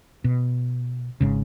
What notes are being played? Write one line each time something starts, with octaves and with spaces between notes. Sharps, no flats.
B2
G#1 G#2 C#3